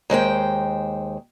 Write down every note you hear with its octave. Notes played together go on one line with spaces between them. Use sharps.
D#2 G#3 C5 G5